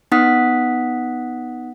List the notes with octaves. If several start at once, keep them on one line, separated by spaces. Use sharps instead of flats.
B3 D#4 F#5 D#6 F#6 B6